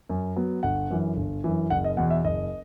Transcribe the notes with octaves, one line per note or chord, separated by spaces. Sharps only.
F#2
F#3 B3
G1 F#5
F#2 E3
G1
F#2 E3
F#1 F#5
D#5
E2 B2 F#5
E5
F#1 D#5